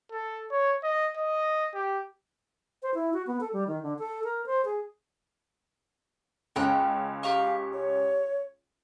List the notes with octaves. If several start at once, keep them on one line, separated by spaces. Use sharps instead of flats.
A4
C#5
D#5
D#5
G4
C5
E4
F#4
B3
A4
G3
D#3
D3
A4
A#4
C5
G#4
C#2 C#4 G5 A#5 F#6
G4 F5 A#5 C#6
C#5